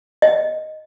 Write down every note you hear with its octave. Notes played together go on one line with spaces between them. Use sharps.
D#5